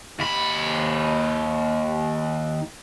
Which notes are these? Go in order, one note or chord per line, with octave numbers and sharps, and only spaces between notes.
D#2 B5